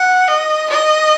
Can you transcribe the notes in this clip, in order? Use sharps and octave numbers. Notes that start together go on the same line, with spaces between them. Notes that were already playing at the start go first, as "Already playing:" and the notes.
Already playing: F#5
D#5
D#5